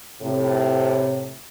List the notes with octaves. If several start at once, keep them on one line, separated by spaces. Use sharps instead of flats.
A2 C3